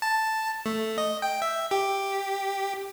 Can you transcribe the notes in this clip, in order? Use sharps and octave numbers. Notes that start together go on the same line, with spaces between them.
A5
A3
D#5
G5
E5
G4